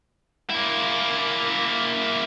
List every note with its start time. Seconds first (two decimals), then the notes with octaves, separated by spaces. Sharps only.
0.50 A#3 E4